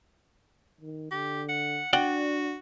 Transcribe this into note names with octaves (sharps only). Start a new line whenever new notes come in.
D#3
D3 G4
F#5
D4 F#4 D5 F#5 G5